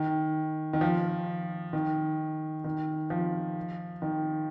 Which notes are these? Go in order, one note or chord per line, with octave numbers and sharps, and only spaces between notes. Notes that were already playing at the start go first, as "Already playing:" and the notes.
Already playing: D#3
D#3
F3
D#3
D#3
F3
D#3